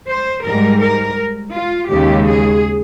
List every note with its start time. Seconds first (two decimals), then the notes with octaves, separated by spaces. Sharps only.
0.08 C5
0.44 G#2 G3 A#4
0.81 A#4
1.53 F4
1.90 D#2 C#3 G#3 G4
2.26 G#4